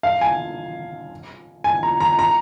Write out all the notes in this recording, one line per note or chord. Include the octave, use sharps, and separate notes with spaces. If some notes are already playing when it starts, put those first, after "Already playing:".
F5
G#5
G#5
A#5
A#5
A#5